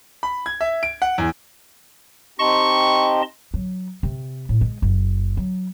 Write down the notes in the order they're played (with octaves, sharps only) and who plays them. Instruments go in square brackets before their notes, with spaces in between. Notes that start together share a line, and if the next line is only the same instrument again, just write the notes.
[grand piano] B5
G#6
E5
D7
F#5
E2
[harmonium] C4 D#4 G4 [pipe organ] D#5 A5 C6 [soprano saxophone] C#6
[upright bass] F#3
C3
A2
G#3
F#1
F#3